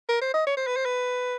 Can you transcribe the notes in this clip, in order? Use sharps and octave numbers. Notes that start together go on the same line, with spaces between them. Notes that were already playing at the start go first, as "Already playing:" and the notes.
A#4
C5
D#5
C#5
C5
B4
C5
B4